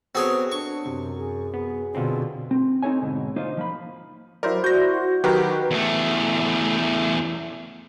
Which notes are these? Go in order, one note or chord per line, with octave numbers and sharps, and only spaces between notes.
B3 C4 F#4 G#4 A4 C#5
D4 C#6
F#2 C3
G#4
B3 G#4
B2 D3 C4 F4
C4
C4 D#4 E4 A4 C#5 G#5
G#2 B2 D3
A#3 D4 D#4 F4 C5
F3 A#3 B5
F#3 E4 A#4 C5 D5
F#4 G6 A#6
D#3 F#3 F#4 G4 A#4 B4 G5
E2 A3